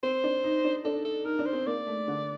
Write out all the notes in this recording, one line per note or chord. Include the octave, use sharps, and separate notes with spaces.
C4 C5
D4
D#4
D4
D4 A4
A4
D#4 A#4
D4
C5
C4
A#3 D5
A3
D3